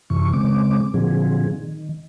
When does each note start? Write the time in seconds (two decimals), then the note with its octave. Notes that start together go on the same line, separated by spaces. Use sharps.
0.10 F#2 C3 E3 C#6
0.33 C#3 G#3 C4 D6
0.94 A#2 D3 F3 F#3 C4 G#4
1.50 D#3